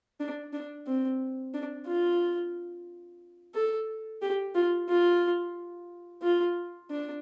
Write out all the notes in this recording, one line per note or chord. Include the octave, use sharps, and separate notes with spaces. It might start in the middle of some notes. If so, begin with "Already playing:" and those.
D4
D4
C4
D4
F4
A4
G4
F4
F4
F4
D4